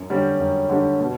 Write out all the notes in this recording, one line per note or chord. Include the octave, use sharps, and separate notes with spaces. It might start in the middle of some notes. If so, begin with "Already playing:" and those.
Already playing: F#2
D3 G3 C#4 G4
F#2
D3 G3 C#4 G4
B2